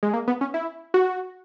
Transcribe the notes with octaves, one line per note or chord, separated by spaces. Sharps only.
G#3
A#3
B3
C#4
E4
F#4